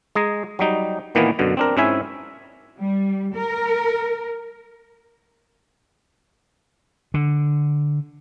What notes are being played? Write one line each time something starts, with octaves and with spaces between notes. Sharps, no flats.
G#3 G#4 A#5
F#3 G3 D#4
A#2 D#3 E3 A#3 B3
F#2 B2 D3
C4 D4 A#4
G#2 C4 C#4 E4 E5 G#5
G3
A#4
D3